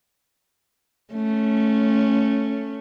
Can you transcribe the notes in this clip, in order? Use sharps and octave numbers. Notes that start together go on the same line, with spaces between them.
A3 C#4